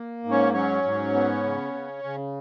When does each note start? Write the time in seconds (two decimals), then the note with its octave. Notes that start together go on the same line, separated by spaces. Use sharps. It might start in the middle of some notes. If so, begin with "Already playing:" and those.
Already playing: A#3
0.24 G#2
0.31 C#4 C#5
0.53 F#3 C#4 C#5
0.84 G#2
1.14 B3
1.43 C#3
1.74 C#3
2.04 C#3